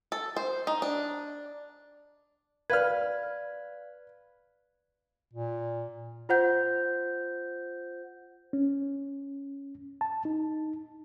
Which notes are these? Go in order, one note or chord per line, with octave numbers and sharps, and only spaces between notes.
A4
C5
D#4
D4
B4 D5 F5 F6 G#6
A#2
F4 C5 F#5 G6
C#4
A5
D#4